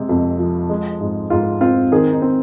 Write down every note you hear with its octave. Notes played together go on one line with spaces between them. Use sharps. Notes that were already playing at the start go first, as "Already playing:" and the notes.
Already playing: C3 G#3
F2
F3
G#3
G#2
G#2 F4
C4 F4
D#3 G#4
D#4
C4